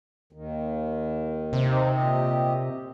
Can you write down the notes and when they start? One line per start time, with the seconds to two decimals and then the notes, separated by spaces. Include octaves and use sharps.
0.33 D#2 D#3
1.53 C3
1.67 C4 D#4
1.94 A#2 G4 D#5